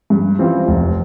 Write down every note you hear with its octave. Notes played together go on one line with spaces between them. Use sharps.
G2
E3 G3 C4 F4
F1